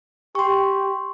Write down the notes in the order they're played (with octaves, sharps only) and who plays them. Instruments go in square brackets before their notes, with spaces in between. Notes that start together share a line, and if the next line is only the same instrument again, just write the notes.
[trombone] G4 [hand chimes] C6 C#6